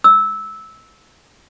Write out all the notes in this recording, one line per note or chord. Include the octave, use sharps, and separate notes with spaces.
E6